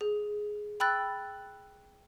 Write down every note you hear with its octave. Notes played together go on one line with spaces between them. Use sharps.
G#4
G5 B5 E6 F#6 A6